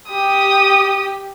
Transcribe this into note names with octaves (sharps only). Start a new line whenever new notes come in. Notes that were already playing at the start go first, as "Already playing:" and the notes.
G4 D#6